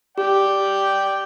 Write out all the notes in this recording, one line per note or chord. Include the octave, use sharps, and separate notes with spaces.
G4 D5 G5